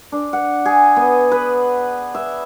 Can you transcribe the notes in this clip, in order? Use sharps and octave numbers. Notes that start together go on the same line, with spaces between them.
D4
F#5
G#4
B3
B4
E5